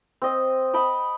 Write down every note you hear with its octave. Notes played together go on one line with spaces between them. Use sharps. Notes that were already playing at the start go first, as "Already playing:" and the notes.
C4 D#5
D#5 G5 A5 B5